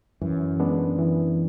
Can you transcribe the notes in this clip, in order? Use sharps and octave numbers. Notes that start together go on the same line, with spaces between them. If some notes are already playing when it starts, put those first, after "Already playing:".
F#2 E3
G#3 B3 D4
E3